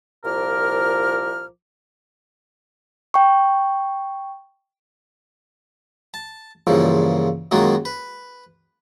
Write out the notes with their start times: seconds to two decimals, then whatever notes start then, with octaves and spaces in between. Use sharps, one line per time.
0.24 C2 A#2 F3 A#4 D6 F6
3.14 G5 C#6
6.14 A5
6.67 E2 G2 A#2 C#3 F3
7.51 F#2 D#3 G#3 A#3 F4 F#4
7.85 B4